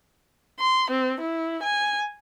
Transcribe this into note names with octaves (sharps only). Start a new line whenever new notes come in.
C6
C4
E4
G#5